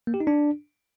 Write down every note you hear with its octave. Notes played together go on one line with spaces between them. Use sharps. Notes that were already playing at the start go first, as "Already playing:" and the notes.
A#3
G4
D#4
D4